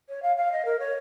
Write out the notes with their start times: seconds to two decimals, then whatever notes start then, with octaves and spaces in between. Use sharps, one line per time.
0.09 C#5
0.22 F5
0.36 F5
0.52 D#5
0.65 A#4
0.79 C#5